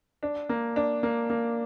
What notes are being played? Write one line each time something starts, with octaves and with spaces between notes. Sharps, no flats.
D4
A#3
D4
A#3
A#3